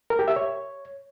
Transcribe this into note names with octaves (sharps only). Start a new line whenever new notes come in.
A#4
G4
E5
C#5